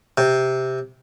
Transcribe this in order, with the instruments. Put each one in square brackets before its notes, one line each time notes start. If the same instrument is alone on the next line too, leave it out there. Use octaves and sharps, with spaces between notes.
[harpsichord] C3